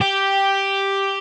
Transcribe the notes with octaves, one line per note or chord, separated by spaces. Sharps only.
G4